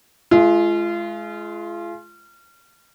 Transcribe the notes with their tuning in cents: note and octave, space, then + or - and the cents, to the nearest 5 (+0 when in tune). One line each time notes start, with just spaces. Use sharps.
G#3 +30 F4 -30